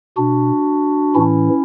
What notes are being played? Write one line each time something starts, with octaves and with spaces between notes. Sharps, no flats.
B2 D4 F#4
A2 E3 C#4 E4